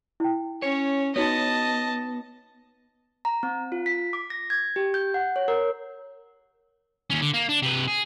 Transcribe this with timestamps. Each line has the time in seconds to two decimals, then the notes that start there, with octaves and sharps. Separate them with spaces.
0.20 E4 G5
0.62 C#4 C#5
1.16 B3 D#4 F#4 C#5 D#5 A5
3.25 A#5
3.43 C4
3.72 F4
3.86 B6
4.13 D6
4.30 A#6
4.50 G#6
4.76 G4
4.94 G6
5.14 F#5
5.36 C#5
5.48 A#4
7.10 D#2 C#4
7.22 D3
7.34 A#3
7.49 D4
7.62 C3 B4
7.88 G#4